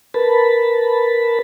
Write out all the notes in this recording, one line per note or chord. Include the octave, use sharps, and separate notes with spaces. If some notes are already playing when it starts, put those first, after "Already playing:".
A#4 B4 A5 B5